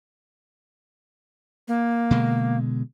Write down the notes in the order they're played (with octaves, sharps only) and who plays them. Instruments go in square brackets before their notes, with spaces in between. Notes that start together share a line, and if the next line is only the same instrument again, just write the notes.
[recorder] A#3
[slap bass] B2 D3 G#3